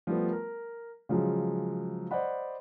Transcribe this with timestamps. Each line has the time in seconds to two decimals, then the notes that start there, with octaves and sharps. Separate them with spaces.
0.07 F3 G3 A3 B3
0.32 A#4
1.09 C#3 F3 F#3 G#3
2.11 C5 D5 D#5 F#5 B5